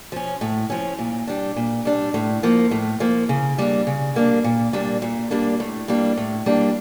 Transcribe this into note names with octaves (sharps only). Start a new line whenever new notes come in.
F3 C#4
A2
F3 C#4
A#2
G3 D4
A#2
G3 D4
A2
F3 A#3
A2
F3 A#3
C#3
G3 A#3 D4
C#3
G3 A#3 D4
A#2
G3 A#3 D4
A#2
G3 A#3 D4
A2
G3 A#3 D4
A2
G3 A#3 D4